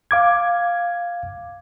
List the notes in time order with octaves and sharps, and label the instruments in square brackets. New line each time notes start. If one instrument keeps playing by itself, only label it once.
[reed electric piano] F5 D6 G#6